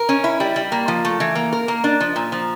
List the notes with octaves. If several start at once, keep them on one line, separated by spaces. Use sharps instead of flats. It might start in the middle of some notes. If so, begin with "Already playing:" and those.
Already playing: A#4
C#4
E4
G3
G3
A#3
F3
A3
E3
A#3
A#4
A#3
D4
F3
A#2
F3